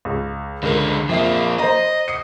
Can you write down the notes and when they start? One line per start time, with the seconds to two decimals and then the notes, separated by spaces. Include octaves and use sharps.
0.05 C#2
0.63 C#2 D3 G#3 A#4
1.09 F2 F3 A#3 E5 C7
1.59 C5 D#5 A#5
2.08 D#6 C7 C#7